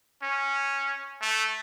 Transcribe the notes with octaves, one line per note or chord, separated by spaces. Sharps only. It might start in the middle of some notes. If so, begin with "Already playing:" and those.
C#4
A3